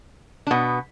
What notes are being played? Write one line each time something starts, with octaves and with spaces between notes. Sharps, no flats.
D4
B2 B3